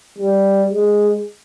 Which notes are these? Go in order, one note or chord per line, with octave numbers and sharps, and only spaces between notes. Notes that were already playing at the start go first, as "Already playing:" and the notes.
G3
G#3